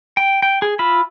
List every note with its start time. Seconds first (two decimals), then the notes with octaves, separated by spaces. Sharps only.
0.17 G5
0.42 G5
0.62 G#4
0.79 F4 E5 B5